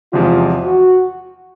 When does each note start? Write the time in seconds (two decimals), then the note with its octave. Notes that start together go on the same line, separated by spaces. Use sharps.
0.13 E2 C3 F3 G#3 F4
0.64 F#4